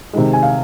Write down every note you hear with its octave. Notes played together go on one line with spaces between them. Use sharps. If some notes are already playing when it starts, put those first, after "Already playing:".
C3 D#3 G#3
G#5
F5